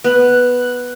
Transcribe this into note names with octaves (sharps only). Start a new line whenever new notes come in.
B3 F#6